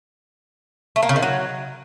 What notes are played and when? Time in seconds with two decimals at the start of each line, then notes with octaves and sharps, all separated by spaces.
0.96 A3
1.03 A#3
1.09 C#3
1.16 D#3
1.22 F#3